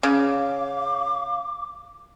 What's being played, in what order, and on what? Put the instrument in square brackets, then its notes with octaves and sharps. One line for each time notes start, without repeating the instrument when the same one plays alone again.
[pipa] C#3 [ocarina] F5 [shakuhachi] D6